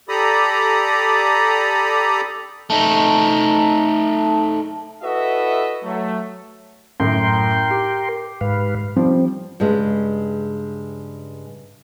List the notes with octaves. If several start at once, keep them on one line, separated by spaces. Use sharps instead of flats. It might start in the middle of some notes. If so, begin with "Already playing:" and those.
G4 A4 D5 A#5 B5 D#6
A3 D#4 A5
E4 F#4 A4 B4 D#5 E5
F#3 A3
F#2 A2 A#4 G5 C6
G4
G#2 B4 F5
F3 G3 C4
G2 C#3 G#3